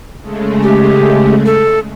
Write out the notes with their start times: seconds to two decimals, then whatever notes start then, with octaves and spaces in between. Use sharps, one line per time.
0.22 C#3 G#3 A3
0.63 G4
1.46 A4